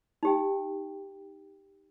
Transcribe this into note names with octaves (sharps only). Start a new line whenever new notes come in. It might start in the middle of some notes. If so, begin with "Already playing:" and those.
D#4 G4 G5